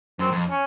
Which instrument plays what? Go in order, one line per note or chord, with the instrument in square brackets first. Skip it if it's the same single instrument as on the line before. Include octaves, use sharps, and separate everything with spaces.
[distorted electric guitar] F#2 [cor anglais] C4
[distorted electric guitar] F2
[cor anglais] C#4